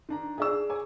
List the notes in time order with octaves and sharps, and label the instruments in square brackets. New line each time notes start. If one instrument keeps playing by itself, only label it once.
[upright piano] D#3 D4 A#5
[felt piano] G#4 D5 E6
[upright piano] C#5 G#5 D6